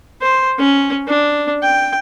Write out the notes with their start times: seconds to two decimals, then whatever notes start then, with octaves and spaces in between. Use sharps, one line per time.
0.22 C5
0.58 C#4
1.08 D4
1.62 G5